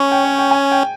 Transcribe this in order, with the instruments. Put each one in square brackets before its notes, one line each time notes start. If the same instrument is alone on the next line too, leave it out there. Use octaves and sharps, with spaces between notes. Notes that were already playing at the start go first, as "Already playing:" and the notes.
Already playing: [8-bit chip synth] C#4 [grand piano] C#6
[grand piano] G5
C#5
G5
G#5
G5